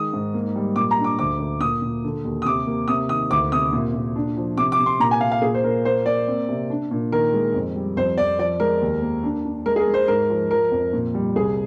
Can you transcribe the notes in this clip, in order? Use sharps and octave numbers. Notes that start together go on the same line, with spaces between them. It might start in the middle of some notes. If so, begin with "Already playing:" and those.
Already playing: D#3 G#3 D#6
G#2
A#3
G3
A#2 D6
A#5
D4
D6
D2 D6
D2
A#2 D#6
A#2
D3
D#2
D#6
C3 D6
A#3
C3 D#6
D#3 D#6
D2 D6
C3 D#6
A#2
A#2
D4
F3
C3 D6
D6
C3
C6
A#2 A#5
G#5
A#2 F5
F5
A#2 G#4
C5
A#2 A#4
A#3 C5
A#3 D5
C4
C3
D4
A#2
D#3 A#4
G#3
F2
G3
F2 C5
F2 D5
F3 D5
G#3 A#4
D#2
A#3
D4
D4
G#3 A#4
G#4
A#4
G#3
C5
G#2 A#4
F3
F3 A#4
F2
A#2
G3
C2 G#4